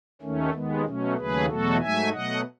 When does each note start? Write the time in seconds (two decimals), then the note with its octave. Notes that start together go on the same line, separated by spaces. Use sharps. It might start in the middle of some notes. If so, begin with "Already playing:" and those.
0.22 D#2 D#3 A3 C#4
0.53 D#2 D#3 G#3 B3
0.85 B2 F#3 A3 C#4
1.16 D#2 C#3 F#3 A3 G#4 B4
1.48 E2 B2 F#3 A3 F#4 A4
1.80 G#2 F#3 A3 E5 G#5
2.12 B2 F#3 A3 D#5 F#5